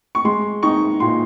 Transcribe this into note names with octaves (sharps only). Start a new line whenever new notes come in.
C#6
G#3 C6
D#4 C#6
A#2 C6